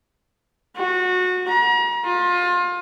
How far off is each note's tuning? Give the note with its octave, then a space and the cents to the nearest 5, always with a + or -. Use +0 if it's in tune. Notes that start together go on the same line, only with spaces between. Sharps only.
F#4 -20
A#5 +40
F4 +25